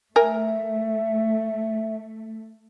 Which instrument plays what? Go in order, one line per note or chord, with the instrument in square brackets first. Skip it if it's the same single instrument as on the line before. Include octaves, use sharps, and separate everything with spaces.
[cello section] A3 [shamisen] A#4 G#5 [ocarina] E5